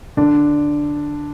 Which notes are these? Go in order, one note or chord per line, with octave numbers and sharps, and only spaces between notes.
D3 D4